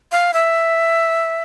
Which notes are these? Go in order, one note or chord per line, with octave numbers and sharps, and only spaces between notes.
F5
E5